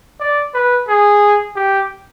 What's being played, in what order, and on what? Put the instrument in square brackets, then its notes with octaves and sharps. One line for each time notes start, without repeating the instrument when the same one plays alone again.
[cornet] D5
B4
G#4
G4